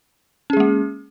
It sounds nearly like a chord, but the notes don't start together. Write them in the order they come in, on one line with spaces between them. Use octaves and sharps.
C#4 G#4 G#3 A#3